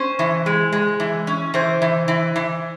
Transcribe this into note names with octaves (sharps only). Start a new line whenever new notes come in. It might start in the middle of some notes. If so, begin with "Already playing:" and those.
Already playing: C#4 C5
E3
G#3
G#3
E3
C#4
E3 C5
E3
E3
E3